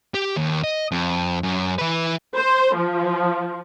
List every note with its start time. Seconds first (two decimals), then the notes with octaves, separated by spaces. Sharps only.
0.14 G4
0.36 D#2
0.64 D#5
0.92 F2
1.43 F#2
1.79 E3 B4
2.36 C5
2.76 F3